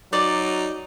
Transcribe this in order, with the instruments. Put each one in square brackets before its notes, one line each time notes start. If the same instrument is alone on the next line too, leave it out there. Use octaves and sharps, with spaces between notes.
[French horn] F#3 [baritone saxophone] D#4 [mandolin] D5